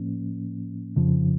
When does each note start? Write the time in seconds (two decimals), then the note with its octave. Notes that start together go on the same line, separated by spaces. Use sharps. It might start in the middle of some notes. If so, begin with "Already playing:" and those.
Already playing: A2 F3 A#3 C#4
0.96 F2 C#3 F3